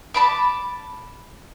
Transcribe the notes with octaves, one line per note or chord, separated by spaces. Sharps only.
A5 B5 D6